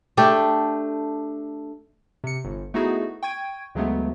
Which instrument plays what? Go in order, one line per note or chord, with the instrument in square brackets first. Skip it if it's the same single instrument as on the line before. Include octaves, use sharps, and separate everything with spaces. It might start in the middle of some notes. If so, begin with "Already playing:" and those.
[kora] A3 D4 G4
[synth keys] C3 C#7
G1
A3 B3 D#4 E4 F#4 G#4
G5 C#6 G#6 D#7
D2 C#3 F#3 G#3 A3 B3